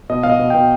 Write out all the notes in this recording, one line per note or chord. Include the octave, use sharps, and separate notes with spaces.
B2 D#5
B2 F5
D#5
B2
B2 G5